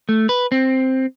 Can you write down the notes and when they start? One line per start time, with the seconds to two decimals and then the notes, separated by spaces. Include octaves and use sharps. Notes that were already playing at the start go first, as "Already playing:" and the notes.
0.09 A3
0.29 B4
0.52 C4